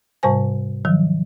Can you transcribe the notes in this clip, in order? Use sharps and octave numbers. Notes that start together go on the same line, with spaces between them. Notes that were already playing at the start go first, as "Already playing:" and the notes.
G#2 C3 G3 C5 G#5
D#3 F3 F#3